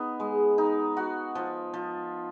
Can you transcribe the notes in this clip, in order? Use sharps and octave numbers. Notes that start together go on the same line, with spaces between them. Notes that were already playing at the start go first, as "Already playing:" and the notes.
Already playing: B3 D#4
G#3
D#4
F#4
F3
F3